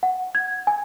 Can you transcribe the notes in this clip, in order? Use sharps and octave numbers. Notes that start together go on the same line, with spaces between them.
F#5
G#6
G#5